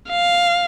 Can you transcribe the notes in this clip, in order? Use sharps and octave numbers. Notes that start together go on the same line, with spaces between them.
F5